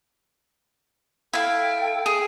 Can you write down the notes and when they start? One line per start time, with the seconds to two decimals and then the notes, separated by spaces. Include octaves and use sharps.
1.33 E4 A4 F5 G5
2.06 G#4